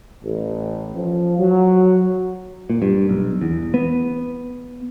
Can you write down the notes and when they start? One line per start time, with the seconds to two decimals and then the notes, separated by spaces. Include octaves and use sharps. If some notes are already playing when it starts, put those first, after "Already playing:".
0.23 A1
0.96 F3
1.39 F#3
2.70 A#2
2.82 G2
3.09 B1
3.41 E2
3.74 B3